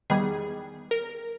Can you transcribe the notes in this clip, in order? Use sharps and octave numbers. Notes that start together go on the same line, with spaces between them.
E2 D#3 G3 B3 G#4
A#4